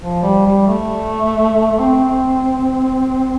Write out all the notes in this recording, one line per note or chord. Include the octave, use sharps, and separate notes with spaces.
F3
G3
G3
A3
C4